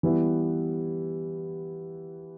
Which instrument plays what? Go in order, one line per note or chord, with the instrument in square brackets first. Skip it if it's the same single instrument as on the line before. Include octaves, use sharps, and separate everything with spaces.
[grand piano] E3 G3 B3 E4